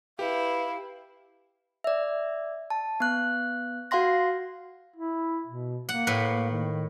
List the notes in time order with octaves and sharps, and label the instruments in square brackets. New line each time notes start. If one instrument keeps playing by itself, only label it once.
[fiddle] E4 [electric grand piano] G4 [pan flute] B4 [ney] F5
[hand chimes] D5 E5
A5
B3 F#6
F#4 F5 F#5 C6 A#6
[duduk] E4
B2
[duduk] A#3 [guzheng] F#5
[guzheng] A2 B4
[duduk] D#3